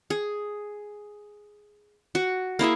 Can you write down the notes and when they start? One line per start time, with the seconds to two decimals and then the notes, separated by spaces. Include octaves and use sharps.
0.10 G#4
2.15 F#4
2.59 A#3 E4 G#4 E5